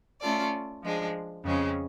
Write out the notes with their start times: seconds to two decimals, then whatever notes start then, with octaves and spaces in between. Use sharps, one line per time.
0.21 A3 C#4 F4 A4 D5
0.82 F3 G#3 D4
1.44 F2 C#3 G#3 C#4